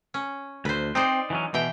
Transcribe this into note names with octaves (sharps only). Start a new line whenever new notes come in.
C#4
D2 B4 C5
C4 D#4 C5 D5
E3 F#3 C#4
B2 E3 G5